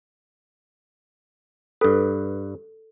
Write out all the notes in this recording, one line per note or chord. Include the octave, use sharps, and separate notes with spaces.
G2 A4 B4